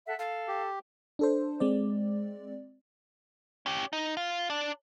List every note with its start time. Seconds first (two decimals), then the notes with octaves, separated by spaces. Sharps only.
0.07 A4 E5 F#5
0.19 A4 F5
0.48 G4
1.19 D4 A4 C5
1.60 G#3 C4 D5
3.66 C#4 G4
3.93 D#4
4.17 F4
4.50 D4 D5